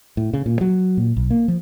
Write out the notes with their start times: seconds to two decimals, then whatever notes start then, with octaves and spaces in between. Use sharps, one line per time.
0.17 A2
0.34 C#3
0.46 A#2
0.61 F#3
0.97 A#2
1.17 B1
1.30 A#3
1.48 F3